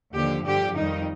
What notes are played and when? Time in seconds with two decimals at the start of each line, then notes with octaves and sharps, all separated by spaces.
0.13 D#2 D3 F3 G4
0.44 G2 D3 F3 G4
0.75 F2 D#3 G3 D#4